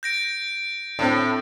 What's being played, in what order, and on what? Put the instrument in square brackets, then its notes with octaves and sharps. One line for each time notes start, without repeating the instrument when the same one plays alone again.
[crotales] G6 A#6 D7
[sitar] A2 [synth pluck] C4 D4